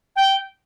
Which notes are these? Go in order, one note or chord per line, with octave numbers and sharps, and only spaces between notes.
G5